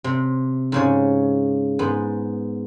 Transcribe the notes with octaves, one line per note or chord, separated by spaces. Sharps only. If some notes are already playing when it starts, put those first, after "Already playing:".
C3
G#2 C#3 C#5
G#2 B3